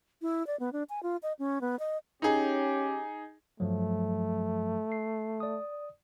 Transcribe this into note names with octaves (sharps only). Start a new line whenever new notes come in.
E4
D5
B3
D4
G#5
F4
D#5
C#4
B3
D#5
C#4 D#4 G4 G#4
G2 F3 F#3 A3
C7
D5 D#6